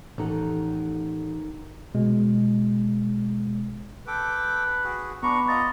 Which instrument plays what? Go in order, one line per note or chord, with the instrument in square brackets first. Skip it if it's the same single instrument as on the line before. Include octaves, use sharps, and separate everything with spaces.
[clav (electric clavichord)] A1 [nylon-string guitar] D#3 [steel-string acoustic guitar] A4 F#5
[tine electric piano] B2 G#3
[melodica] A4 G5 D6 [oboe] B4
[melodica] F#4 G#4
[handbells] B3 B5 D6 [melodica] D4 A#5 [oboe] C#6
[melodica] F4 A#5 [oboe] D#5 [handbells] A6